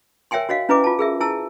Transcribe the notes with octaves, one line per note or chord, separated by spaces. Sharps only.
A#4 C#5 E5 G5 G#5 C6
F#4 C#5 D#5 F5
C#4 E4 B4 D#5 G#5 D6
F4 A5
G#4 A#4 E5
E4 G#5 A5 E6